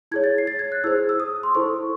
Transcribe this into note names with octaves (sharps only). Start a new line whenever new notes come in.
E4 G#4 C#5 G#6
A6
C7
A6
G#6
F#6
E4 G#4 C5 E6
E6
D#6
C6
E4 A4 C5 C#6